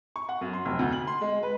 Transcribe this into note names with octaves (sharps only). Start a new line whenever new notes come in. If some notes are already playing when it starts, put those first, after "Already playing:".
C#6
F#5
F#2
C6
F1
D2
F#7
C6
G#3
B4